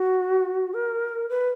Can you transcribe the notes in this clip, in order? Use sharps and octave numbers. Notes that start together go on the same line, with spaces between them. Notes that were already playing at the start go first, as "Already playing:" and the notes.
Already playing: F#4
A#4
B4